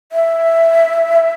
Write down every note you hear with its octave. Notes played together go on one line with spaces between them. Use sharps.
E5